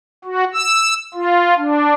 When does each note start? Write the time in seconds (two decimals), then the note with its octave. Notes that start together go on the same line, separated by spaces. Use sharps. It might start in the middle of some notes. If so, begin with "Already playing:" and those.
0.25 F#4
0.54 E6
1.14 F4
1.57 D4